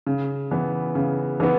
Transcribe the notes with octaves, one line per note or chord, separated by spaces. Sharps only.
C#3
E3 B3
C#3
E3 B3